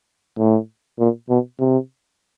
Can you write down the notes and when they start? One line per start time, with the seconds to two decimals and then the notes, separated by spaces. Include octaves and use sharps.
0.39 A2
0.99 A#2
1.30 B2
1.60 C3